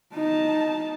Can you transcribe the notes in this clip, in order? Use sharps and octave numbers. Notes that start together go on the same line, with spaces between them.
D#4 A5